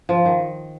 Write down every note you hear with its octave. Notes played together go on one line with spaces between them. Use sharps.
F3
D#3